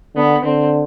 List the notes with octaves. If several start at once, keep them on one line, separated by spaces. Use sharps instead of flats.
D3 B3
D3 C4